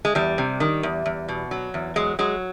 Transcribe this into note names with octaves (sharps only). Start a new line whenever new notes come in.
G#3
E2 G3
C3
D#3
E2
E2
B2
F#3
E2
F#3 G#3
F#3 G#3